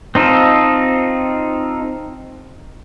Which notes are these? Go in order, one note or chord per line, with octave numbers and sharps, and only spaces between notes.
C4 D#4 F4 A4